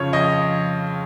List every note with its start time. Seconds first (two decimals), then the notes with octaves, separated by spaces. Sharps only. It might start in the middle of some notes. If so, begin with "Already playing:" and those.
Already playing: F2 C#3 F3 C#5
0.13 F2 D#5